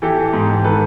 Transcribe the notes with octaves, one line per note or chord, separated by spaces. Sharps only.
E3 G4 A4
E3
G#2
G#2
D#3 A4 B4